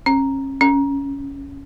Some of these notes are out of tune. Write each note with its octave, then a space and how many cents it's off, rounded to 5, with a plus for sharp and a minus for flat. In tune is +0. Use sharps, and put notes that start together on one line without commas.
C#4 -35
C#4 +5